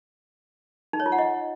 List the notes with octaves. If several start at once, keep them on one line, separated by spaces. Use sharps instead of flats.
D#4
C#5
F4
F#5
D#5